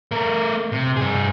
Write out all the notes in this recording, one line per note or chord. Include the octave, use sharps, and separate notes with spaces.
A3 A#4
C3
G2 G#4